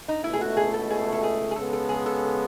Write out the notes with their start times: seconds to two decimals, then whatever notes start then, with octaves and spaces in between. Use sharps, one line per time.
0.08 D#4
0.24 C#2 B2 A3 E4
0.33 G#4
0.41 F#4
0.57 G#4
0.74 A4
0.90 G#4
1.13 A4
1.23 G#4
1.51 G#4
1.56 C#3 G#3 B3 A4
1.73 A4
1.89 G#4
2.06 A4